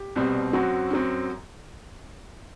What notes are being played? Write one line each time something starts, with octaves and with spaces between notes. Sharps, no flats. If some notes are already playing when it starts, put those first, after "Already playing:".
Already playing: G4
C2 B2 G3 C4
F#2 F#3 C4 F#4
F#2 F#3 C4